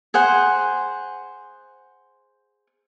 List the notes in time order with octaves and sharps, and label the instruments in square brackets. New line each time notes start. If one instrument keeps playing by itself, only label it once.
[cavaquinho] G#4 C5 F#5